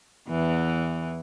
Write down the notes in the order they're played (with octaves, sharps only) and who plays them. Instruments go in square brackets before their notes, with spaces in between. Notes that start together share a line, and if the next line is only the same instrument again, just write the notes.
[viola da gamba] E2 E3